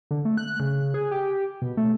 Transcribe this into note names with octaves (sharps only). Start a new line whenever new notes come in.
D3
A3
F#6
C#3
G#4
G4
B2
A3